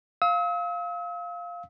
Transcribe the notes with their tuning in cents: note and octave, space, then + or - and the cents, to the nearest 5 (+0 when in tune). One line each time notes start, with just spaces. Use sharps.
F5 +0 E6 -45